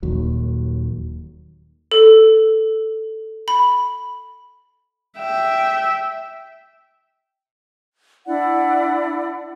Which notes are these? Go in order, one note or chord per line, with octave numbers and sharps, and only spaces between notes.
D#1 D#2 F#3
A4
B5
E5 G5
D4 E4 D5 F#5